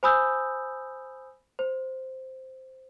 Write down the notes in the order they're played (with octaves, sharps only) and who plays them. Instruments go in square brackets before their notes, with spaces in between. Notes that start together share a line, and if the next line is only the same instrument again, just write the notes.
[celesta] C5 G#5 B5 D#6 E6 G6
C5